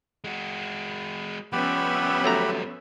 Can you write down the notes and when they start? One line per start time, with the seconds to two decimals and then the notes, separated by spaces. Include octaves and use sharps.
0.24 G#3 F#4
1.52 F3 G3 B3 C#4 G4 E5 F#5 B5
2.24 F#3 A3 A#5